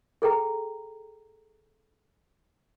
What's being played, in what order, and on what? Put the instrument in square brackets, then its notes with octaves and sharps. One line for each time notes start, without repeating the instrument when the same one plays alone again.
[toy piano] G#4 A4 G5 A#5